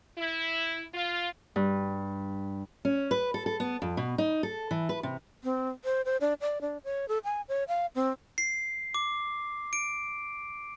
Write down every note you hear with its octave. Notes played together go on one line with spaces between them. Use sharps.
E4
F4
G2
C#4
B4
A4
A4
B3
F2
B2
D#4
A4
E3
B4
C3
C4
C5
C5
D4
D5
D4
C#5
A4
G#5
C#5
F5
C4
C7
D6
D7